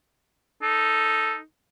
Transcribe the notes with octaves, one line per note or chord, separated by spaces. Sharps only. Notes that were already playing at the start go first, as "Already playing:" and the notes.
D#4 A4